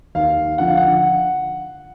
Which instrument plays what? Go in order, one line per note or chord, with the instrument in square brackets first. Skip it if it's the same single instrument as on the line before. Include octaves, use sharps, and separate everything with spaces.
[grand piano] D#2 F5
D3 F3 F#5
F5
F#5